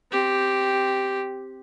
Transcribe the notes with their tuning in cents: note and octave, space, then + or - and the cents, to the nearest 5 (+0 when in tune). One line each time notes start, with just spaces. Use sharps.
C4 +0 G4 +0